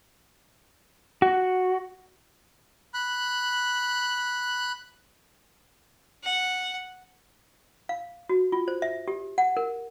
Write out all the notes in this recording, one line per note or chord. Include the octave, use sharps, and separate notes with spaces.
F#4
B5 F#6
F#5
F5
F#4
F4
C5
E5
G4
F#5
A#4